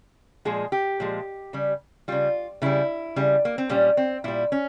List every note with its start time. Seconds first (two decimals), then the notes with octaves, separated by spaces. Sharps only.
0.45 A#2 F3 G#3 G#4
0.72 G4
1.00 A#2 F3 G#3
1.53 C#3 G3
2.08 C#3 G3 F4
2.62 C#3 G3 E4
3.16 C#3 G3
3.45 A#3
3.58 C4
3.69 A#2 G3 C#4
3.97 C4
4.24 A#2 G3 E4
4.52 C#4